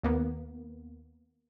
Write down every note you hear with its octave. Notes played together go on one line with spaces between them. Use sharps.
D#2 A#3 B3